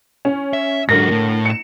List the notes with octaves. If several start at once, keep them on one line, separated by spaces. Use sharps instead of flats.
C#4
E5
G#2 D3 F#3 A#4 A#6
A2
C#7 E7